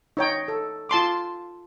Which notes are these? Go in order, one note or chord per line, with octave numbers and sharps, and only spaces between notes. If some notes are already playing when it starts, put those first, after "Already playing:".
D#4 C#5 G5
A4
F4 A5 C6 D6